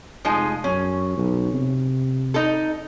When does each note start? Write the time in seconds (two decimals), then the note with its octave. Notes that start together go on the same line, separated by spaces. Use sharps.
0.25 F1 F3 G#3 D#4
0.64 F#2 C#4
1.17 B1
1.53 C3
2.34 D#4 A4